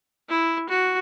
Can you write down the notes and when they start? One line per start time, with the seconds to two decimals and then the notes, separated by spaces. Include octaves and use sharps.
0.29 E4
0.69 F#4